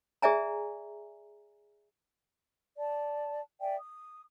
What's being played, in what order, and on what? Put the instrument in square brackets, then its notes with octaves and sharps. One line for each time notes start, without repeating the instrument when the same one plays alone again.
[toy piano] G#4 D5 E5 G#5 A#5
[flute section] D5 A5
D5 E5 G5 G#5
D#6